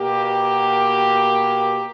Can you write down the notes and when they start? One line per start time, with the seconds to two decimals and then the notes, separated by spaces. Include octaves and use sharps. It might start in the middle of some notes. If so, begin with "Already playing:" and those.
Already playing: B2 A#3 G4